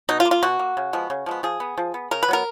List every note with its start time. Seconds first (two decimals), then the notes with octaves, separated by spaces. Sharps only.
0.09 B2 D#4
0.20 F4
0.25 A#3
0.31 F4
0.43 B2 F#4
0.59 A#3
0.77 C#3
0.93 F3 G#3 B3
1.10 C#3
1.26 F3 G#3 B3
1.43 F3 G#4
1.60 B3
1.78 F3
1.94 B3
2.11 C#3 A#4
2.23 B4
2.28 F#3 B3 A#4